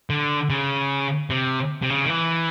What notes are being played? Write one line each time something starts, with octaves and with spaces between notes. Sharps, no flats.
D3
C#3
C3
C3
C#3
D#3
E3